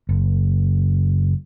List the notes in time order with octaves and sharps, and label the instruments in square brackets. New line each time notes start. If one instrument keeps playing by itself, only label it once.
[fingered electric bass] F#1